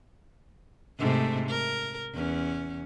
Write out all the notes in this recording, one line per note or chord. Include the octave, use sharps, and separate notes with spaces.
G#2 C3 A3
A#4
E2 C#4